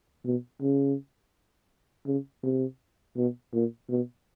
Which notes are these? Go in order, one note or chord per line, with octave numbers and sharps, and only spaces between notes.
B2
C#3
C#3
C3
B2
A#2
B2